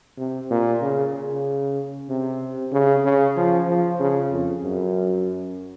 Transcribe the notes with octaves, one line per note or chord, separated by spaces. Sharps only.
C3
A#2
C#3
C#3
C3
C#3
C#3
F3
F3
C#3
F2
F#2